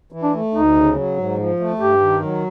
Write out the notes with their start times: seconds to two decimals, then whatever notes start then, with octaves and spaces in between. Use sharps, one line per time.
0.12 E3
0.23 D4
0.33 A3
0.54 D2 D#4
0.76 C#3
0.96 F#3
1.17 G#2
1.38 F3
1.60 A3
1.80 G2 G4
2.01 D#3
2.22 F#3